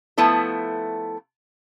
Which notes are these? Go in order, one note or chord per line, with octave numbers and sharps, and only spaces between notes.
F3 A3 B3 E4 A4